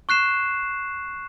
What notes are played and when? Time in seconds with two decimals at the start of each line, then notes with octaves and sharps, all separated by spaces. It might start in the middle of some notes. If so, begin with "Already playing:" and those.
0.09 C#6 F#6 C7 E7